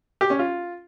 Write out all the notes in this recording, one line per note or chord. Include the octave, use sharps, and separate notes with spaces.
G4
C#4
F4